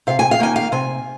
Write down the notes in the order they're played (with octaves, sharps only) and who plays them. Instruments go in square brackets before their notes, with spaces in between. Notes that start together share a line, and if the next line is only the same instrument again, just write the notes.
[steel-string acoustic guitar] C3 F5
G#5
F5
D#3 A#3 D#4 G#5
F5
C3 G#5